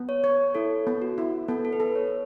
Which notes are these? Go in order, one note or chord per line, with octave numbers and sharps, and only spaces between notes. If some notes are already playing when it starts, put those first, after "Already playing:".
Already playing: B3
C#5
C#5
E4 A4
B3
F#4
E4
B3 A4
A4
B4
A4
C#5